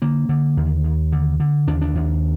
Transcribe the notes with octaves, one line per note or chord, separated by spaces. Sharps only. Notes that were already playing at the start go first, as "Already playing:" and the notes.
D3 A#3
D3
D#2
D#2
D3
D3
D#2 D4
D4
D#2